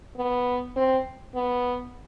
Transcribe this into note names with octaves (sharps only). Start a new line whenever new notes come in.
B3
C4
B3